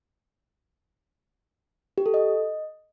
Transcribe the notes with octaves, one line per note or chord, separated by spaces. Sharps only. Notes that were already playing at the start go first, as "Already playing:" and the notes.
G4
A4
D#5